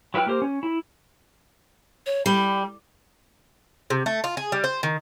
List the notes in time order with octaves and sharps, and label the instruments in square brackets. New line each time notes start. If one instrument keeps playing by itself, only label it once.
[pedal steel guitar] F#3 E4 B4 G5 F6
A#3 G4 A#4 C5
C#4
E4
[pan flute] C#5
[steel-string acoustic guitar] G3 [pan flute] B5
[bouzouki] C3
A3
F4
G#4
G3
C5
D#3